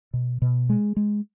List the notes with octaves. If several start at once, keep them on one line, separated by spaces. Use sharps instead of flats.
B2
B2
G#3
G#3